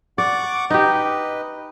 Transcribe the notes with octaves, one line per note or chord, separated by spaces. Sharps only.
D5 F#5 C#6 D6
D#4 G4 B4 D#5